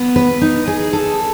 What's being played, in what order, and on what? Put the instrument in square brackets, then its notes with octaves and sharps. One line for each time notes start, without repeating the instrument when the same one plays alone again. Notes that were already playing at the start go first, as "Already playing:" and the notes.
Already playing: [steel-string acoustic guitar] B3
B4
D#4
G#4
A4